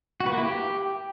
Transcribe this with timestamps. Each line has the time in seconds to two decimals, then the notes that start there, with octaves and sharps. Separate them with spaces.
0.20 F#4
0.26 B4
0.32 A#3
0.38 E4
0.43 G4